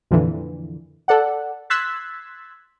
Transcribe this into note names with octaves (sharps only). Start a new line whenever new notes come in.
F2 A#2 D3 E3
A4 D5 F#5
C6 E6 F#6 G#6 A6 B6